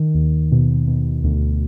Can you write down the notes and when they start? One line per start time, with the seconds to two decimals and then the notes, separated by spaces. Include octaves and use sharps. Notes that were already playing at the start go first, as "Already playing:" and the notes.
Already playing: D#3
0.15 D#2
0.52 B2
0.88 B2
1.24 D2